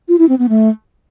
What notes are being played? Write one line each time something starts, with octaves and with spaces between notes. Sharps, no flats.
F4
E4
C4
B3
A3